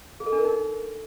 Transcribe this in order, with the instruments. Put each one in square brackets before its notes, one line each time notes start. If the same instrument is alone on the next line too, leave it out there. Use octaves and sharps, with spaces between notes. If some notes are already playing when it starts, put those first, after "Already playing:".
[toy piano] G#4
A4
D4
A#4
D#4